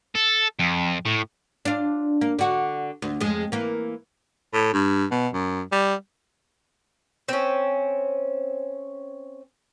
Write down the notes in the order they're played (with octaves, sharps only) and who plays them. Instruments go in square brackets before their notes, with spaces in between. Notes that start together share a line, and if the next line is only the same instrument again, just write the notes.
[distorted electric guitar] A4
F2
A2
[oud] D4 F4
A#3
D3 F#4
D2
F2 G#3
E3 A#3
[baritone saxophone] A2
G2
B2
F#2
G3
[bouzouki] C4 C#4